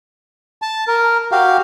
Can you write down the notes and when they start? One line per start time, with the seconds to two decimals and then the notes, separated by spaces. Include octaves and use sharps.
0.62 A5
0.88 A#4
1.32 F#4 G4 F5